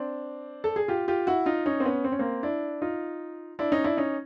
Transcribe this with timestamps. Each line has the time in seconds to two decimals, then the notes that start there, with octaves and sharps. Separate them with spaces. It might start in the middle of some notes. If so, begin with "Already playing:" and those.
Already playing: C4 D4
0.64 A4
0.76 G#4
0.88 F4 G4
1.08 F4 G4
1.27 E4 F#4
1.46 D#4 F4
1.66 C#4 D#4
1.80 C4
1.85 B3 C#4
2.04 C4
2.12 C#4
2.19 A#3 C4
2.43 D4 E4
2.82 D#4 F4
3.59 D4 E4
3.72 C#4 D#4
3.84 D4 E4
3.97 C#4 D#4